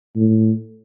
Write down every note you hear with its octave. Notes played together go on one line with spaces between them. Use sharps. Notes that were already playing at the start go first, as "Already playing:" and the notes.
A2